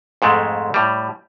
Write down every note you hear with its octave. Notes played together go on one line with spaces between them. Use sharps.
F2 G#2 G#3 A3
A2 G3